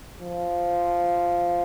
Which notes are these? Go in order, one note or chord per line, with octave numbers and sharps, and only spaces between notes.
F3